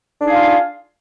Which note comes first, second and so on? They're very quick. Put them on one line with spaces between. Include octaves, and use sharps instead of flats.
D4 D#4 G#4 F5 F4